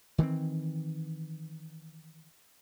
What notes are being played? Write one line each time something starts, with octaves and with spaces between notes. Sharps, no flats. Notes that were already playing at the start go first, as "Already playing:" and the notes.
D#3 E3 G3 C4